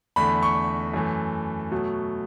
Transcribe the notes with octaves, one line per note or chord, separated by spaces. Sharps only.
E2 D3 A3 B5
C#6
F#2 E3 A3
B2 F#3 A3